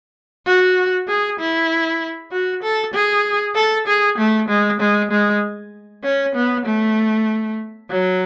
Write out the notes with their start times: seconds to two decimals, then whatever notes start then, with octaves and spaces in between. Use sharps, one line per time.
0.46 F#4
1.08 G#4
1.39 E4
2.31 F#4
2.62 A4
2.94 G#4
3.56 A4
3.87 G#4
4.18 A3
4.49 G#3
4.80 G#3
5.11 G#3
6.04 C#4
6.35 B3
6.65 A3
7.90 F#3